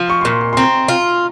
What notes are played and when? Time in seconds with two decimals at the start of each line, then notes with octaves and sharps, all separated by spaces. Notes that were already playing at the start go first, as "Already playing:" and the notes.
Already playing: F3
0.10 C#6
0.21 C6
0.25 A#2 C#6
0.41 C6
0.53 C6
0.57 C4 A#5
0.88 F4